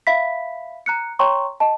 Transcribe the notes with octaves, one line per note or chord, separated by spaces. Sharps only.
E5 F5 B5 B6
A#5 F#6 C#7
C#5 G5 A#5 C6 C#6
D#5 A5